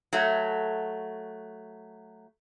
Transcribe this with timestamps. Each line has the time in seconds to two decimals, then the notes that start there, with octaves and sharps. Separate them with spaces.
0.13 F#3 A3